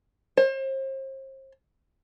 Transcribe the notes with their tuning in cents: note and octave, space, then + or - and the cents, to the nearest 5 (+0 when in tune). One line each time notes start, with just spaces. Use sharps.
C5 +40